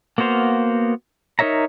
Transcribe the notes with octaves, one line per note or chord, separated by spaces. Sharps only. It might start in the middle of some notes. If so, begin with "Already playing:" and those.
A#3 B3 F#4 C5 F5
D#4 A#4 C#5 E5 A#5